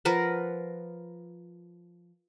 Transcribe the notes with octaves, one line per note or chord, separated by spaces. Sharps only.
F3 A#4 B4 F#5